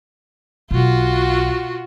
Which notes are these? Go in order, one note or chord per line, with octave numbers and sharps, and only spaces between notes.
B1 F4 F#4